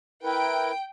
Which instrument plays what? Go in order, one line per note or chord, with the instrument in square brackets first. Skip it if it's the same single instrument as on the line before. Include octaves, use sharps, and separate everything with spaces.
[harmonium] E4 A#4 B4 [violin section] G5 D7